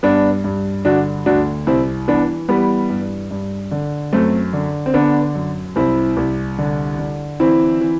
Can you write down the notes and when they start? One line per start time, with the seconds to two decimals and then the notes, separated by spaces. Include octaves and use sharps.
0.03 G2 B3 D4
0.44 G2
0.85 D3 D4 F#4
1.26 D2 D4 F#4
1.67 C2 C4 E4
2.08 E3 B3 D4
2.49 E3 G3 B3
2.90 G2
3.31 G2
3.71 D3
4.13 F#2 A3 C4
4.53 D3
4.86 C4
4.94 D3 B3 D4
5.35 F#2
5.76 C2 C4 E4
6.17 C2
6.58 D3
6.99 D3
7.40 E3 C4 E4
7.81 E3